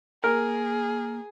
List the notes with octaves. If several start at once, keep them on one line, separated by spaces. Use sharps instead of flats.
A#3 G#4 A#4